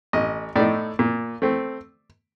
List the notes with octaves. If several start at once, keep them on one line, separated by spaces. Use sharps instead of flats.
A1 D#5
A2 A3 D#4 D5
A#2
A3 C4